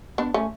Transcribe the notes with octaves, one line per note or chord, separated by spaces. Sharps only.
B3 D4
A3 C#4